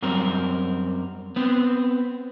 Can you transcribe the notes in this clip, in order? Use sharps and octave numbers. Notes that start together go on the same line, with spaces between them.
F#2 G3 C4 A#4
B3 C4